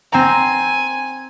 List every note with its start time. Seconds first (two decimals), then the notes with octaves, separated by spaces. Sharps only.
0.12 C4 G#5 A#5